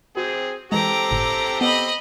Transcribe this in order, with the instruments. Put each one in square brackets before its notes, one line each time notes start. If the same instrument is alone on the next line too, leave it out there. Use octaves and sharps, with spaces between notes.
[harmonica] C4 G#4 [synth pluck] F#4
[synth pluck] E3 G#3 [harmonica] C4 G4 A4 [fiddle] A#5 D6
[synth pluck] G1 A2
[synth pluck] B3 [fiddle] D#5 B5